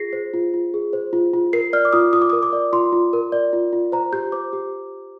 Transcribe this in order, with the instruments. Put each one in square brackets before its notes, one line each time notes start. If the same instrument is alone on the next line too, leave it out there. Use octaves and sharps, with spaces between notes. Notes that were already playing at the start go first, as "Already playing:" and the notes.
Already playing: [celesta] F4 G#4 A#6 C7
C5
F4
F4
G#4
C5
F4
F4
A#4 C7
D5 F6
D6
F4 D#6
F4 D#6
D6
A#4 D#6
D6
D5
F4 C6
F4
A#4
D5
F4
F4
C5 A#5
G4 G6
C5 D6
G4